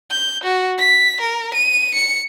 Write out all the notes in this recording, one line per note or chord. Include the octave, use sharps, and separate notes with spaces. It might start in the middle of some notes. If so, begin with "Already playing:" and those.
G6
F#4
B6
A#4
D#7
C#7